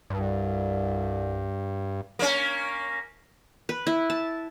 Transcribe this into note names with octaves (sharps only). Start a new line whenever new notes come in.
C2 G2
A#3 C#4
B4
E4
A5